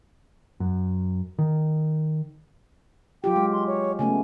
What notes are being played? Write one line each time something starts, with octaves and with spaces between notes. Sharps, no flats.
F#2
D#3
F#3 F4 G4 G5
G#3
C6
C#5
C#3 A3 B3 G#5